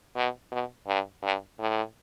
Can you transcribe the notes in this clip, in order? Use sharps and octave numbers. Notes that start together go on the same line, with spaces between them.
B2
B2
G2
G2
A2